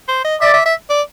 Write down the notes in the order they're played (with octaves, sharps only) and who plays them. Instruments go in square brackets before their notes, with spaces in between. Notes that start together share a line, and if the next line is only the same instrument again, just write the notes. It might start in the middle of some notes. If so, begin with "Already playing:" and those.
[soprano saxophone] C5
D#5
[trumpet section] D5 [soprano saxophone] E5
[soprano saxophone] E5
E5
D5